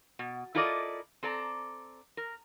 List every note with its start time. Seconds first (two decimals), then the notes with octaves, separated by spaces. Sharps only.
0.19 B2
0.55 E4 F4 A4 A#4 D5 D#5
1.23 C4 A4 D5 A#5
2.17 A#4